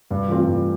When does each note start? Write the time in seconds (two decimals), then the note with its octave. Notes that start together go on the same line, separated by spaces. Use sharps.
0.11 G2
0.29 E3 A3 C4 F4
0.47 G2